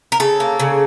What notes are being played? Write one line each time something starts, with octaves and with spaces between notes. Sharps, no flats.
A#4
C#3 A4
A#3
C#3